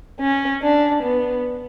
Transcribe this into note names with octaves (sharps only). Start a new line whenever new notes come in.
C#4
D4
B3